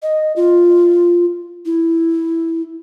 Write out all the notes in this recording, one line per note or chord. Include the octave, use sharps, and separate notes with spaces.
D#5
F4
E4